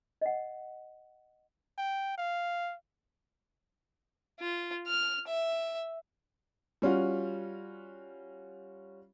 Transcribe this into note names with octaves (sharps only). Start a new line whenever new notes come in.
D#5 F#5
G5
F5
F4
F6
E5
G3 C#4 F4 F#4